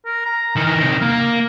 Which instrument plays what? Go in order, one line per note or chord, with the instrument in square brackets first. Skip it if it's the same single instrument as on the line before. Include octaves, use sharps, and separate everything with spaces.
[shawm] A#4
A#5
[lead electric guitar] D#3 E3 [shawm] A#4
[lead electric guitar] C3 D#3
[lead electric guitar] A#3 [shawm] A#4